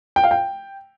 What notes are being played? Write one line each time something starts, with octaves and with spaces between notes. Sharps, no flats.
G5
F5
G5